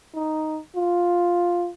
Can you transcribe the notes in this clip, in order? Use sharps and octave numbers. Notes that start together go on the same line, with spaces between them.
D#4
F4